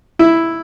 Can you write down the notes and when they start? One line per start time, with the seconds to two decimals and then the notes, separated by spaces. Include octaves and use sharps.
0.19 E4